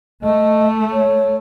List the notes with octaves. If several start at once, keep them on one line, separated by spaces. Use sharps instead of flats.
A3 D#5
C#5